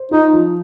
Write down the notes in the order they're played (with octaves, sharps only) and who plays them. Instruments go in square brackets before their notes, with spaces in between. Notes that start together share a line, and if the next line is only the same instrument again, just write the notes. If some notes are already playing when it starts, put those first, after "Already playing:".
Already playing: [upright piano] C5
[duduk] D#4 [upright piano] F4
[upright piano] F3